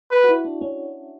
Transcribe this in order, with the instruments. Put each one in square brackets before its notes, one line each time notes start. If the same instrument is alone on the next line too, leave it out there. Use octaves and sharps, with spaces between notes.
[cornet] B4
[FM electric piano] F#4
E4
D4
C#4